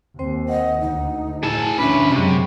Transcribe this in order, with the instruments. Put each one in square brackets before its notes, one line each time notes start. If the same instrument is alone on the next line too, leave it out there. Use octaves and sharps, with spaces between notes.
[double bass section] D#2 [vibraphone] C4 C5 G5
[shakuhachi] D#5 [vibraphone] F#5
[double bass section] D2 [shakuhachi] D#4
[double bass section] A2 [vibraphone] E4 [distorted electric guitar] G#4 A5
[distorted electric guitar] D2 B4 [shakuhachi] C#4 [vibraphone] D4 E5
[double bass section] F#2 F#3 G#3 [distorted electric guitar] C3 [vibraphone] B5 C#6